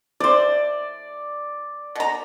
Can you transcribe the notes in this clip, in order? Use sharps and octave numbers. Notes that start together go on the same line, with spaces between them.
E3 C5 D5
B2 A#5